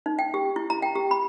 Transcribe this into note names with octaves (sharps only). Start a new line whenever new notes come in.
D#4
G5
G4
E4
A#5
G5
G4
B5